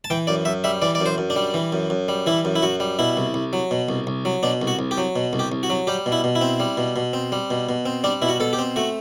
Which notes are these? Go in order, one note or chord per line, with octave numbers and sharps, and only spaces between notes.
A5
E3 G5
F#2 D5
F#2 E5
G3 E5
E3 D5
D5
F#2
C5
F#2
D4
G3
E3
F#2
F#2
G3
E3 E4
F#2
E4
F#2 F#4
G3
B2 E4
C2
C2
F#3
B2
C2
C2
F#3
B2 D4
C2
F#4
C2
G4
F#3
B2
C2
G4
C2
F#4
F#3
G3 G4
B2
E4
B2
E4
C4
G3
B2
B2
C4
G3
B2
B2
C4
G3 D4
B2 E4
F#4
B2 A4
G4
C4
A3 F#4